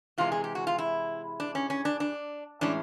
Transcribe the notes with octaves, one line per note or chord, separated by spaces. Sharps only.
C3 E3 G#3 F4
G#4
G4
F#4
F4
E4
D4
C#4
C#4
D4
D4
A2 E3 G#3 C#4 D4